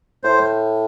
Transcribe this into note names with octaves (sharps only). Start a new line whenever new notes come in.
A2 C5